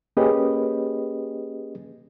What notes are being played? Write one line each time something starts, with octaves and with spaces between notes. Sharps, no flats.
A#3 C#4 G4 G#4 B4 D#5